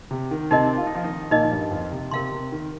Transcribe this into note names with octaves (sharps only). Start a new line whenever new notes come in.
C3
D#3
C3 C4 D#4 A#4 D#5
F4
D#4
F3 F4
D#3 D#4
A#2 A#3 D#4 A#4 D#5
F3
G2 G3
F2 F3
C3
C3 A#4 F5 C6
C3
D#3